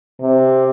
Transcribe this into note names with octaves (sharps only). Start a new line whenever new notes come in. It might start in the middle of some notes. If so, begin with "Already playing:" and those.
C3